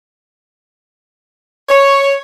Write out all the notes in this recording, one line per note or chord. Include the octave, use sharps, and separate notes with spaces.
C#5